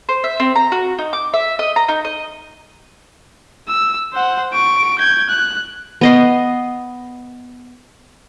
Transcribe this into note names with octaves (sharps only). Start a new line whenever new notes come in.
C5
E5
C4
A#5
F#4
D#4
D6
E5
D#5
A#5
D#4
D#5
E6
C5 F#5
C#6 D7
G6 G#6
F#6
B3 D#5 C6